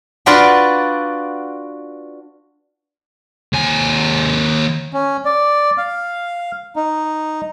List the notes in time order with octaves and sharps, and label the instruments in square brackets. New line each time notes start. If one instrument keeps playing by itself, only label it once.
[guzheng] D4 F4 F#4 B4 D5 F5
[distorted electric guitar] D#2 G#5
[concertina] C#4
D5
F5
D#4